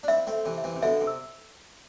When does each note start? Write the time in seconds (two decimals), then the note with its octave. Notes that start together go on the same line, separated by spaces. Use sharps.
0.03 D4
0.08 C4 E4 E5
0.27 A3 C4
0.33 E5
0.45 C3 E3
0.58 E5
0.64 C3 E3
0.75 C3
0.82 B2 D3 E5
1.01 C3
1.07 E6